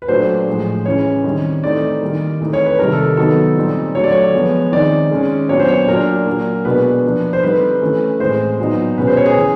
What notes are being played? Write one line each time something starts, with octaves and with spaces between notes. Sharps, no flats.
B4
A#2 F#3 A3 D4 C5
A2 F3 G#3
C#3 E3 G#3 C#4 C#5
D#3 G3 C4
E3 A3 C4 D#4 D5
D#3 G3 A#3
E3 A3 C4 D#4
C#5
B4
C3 D#3 G3 A#4
A4
D#3 F#3 B3 D#4 A4
A#2 G3 C4 D#4
D3 F#3 A3 C#5
D5
C#5
F3 G#3 B3
D#3 G#3 C4 D#4 D5
D#3 G#3 C#4
A#2 F#3 B3 D4 C#5
C5
C#5
A#2 F#3 A#3 D4 A#4
A#2 F#3 A#3
B2 G#3 B3 D4 B4
F3 A#3 D4
C5
D3 G3 C4 D#4 B4
E3 A3 C#4
A2 E3 G#3 C4 C5
A#2 F#3 B3 D#4
B2 G#3 C#4 B4
C5
C#5
G#4
C#3 E3 G#3